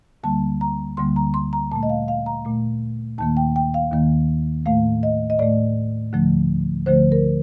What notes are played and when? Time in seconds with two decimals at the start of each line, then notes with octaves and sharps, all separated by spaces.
0.23 D2 D3 G3 A#3 A5
0.61 A#5
0.97 D2 D3 G3 A#3 C6
1.16 A#5
1.34 C6
1.53 A#5
1.72 A#2 A5
1.76 A3
1.83 D#5
1.89 F5
2.08 F5
2.26 A#5
2.45 A#2 A3
3.18 D#2 D#3 A#3 A5
3.37 G5
3.56 G5
3.74 F5
3.92 D#2 D#3 A#3
4.66 A2 A3 F5
5.03 D#5
5.30 D#5
5.39 A2 A3 D5
6.13 D2 D3 F3 A3
6.86 D2 D3 F3 A3 C5
7.12 A#4